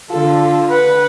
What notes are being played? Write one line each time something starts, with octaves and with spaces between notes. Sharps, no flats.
D3 F4 A4
B4 F#5